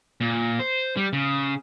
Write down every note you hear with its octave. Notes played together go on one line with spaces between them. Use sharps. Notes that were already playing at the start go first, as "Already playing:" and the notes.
A#2
C5
G3
C#3